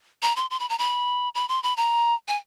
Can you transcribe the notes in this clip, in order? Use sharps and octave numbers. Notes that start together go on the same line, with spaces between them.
A#5
C6
C6
B5
A#5
B5
B5
C6
B5
A#5
G#5